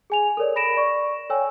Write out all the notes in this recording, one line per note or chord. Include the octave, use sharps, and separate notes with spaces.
G#4 G#5 F7
A4 A#4 C#5 D5
B5 A#6 D7 E7
D5 C#6
A4 C#5 G5 G#5 E6